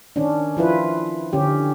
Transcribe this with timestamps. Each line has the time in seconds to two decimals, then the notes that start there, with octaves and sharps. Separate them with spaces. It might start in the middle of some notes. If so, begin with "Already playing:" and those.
0.16 D#3 C#4 D4
0.57 F3 E4 F4 B4
1.33 D3 C#4 G4